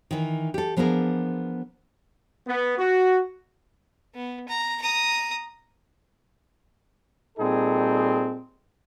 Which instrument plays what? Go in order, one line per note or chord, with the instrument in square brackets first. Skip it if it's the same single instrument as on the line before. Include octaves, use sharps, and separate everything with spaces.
[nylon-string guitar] D#3 E3
G4 A4
F3 B3 D4 G#4 A#4
[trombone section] B3
F#4
[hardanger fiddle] B3
A#5
A#5 D#6
[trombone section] A#2 G3 C4 D#4 G#4 A4